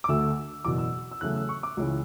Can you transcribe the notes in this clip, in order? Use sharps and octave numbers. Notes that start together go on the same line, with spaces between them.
D6
D2 D3 A3 E6
F#1 E2 B2 D6
E6
E6
E2 C#3 F#3 A3 F#6
E6
C#6
D6
C#2 C#3 E3